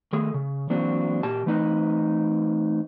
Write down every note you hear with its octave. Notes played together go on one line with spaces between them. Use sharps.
D#3 A3 G#4 A4
C#3
E3 F#3 A#3 C4 D4 F#4
A#2 G4 A5
E3 A3 C4 D#4 B4 D#5